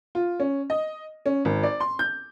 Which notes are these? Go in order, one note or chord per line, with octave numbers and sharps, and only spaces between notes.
F4
C#4
D#5
C#4
G#1
D5
C6
G6